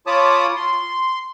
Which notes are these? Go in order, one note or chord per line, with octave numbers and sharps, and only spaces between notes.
F4 C#5 A5 B5 D6 D#6
C6